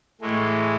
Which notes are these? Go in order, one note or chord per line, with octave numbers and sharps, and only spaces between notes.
A2 E3 G#3 A3